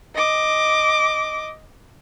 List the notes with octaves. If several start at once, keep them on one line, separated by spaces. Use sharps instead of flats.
D#5 D6